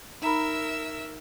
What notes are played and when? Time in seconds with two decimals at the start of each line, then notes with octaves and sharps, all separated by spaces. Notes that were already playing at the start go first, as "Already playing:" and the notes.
0.22 D#4 A#4 E5 A#5 B5 E6